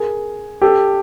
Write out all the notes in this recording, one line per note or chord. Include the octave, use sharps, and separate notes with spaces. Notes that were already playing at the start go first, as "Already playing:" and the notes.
Already playing: G#4 A#4
G4 A4